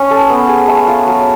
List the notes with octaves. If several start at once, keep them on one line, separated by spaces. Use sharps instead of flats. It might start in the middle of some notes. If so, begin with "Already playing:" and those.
Already playing: C#4
A4
B3
G#4
A3
F4
F#3